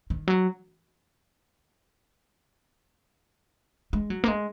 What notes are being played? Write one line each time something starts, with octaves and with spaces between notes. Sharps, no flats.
D#3
F#3
G#3
F#3
A#3
G#3